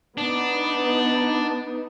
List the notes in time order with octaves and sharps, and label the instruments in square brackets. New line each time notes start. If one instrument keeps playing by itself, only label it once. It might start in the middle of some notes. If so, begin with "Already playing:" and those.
[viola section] B3 D#4 [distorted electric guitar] D4